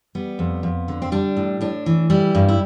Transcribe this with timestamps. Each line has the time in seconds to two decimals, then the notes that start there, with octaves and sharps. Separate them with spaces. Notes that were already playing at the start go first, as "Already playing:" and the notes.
0.15 G3 B3
0.39 F2
0.63 F2
0.88 D3
1.02 C4
1.12 G3 D4
1.37 A2
1.61 A2 D4
1.86 E3
2.10 G3 E4
2.35 G2
2.48 E4